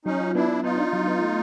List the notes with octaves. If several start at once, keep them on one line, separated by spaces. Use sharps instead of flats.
F#3 C#4 D#4
F4
B3 D4 E4
B3
B3 D#4 F4
D4
F#3
B3
A3